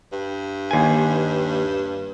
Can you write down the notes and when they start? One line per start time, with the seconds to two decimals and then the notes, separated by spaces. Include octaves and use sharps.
0.12 G2
0.71 D#2 G#5